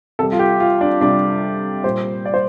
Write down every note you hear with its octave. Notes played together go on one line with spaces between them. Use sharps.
C3 G3 A4
F4
G4
F4
D4
C3 G3 D4
A#2 G3 C5
D5
C5